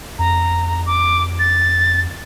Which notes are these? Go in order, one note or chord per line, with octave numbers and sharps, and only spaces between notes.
F2 A#5
D6
A6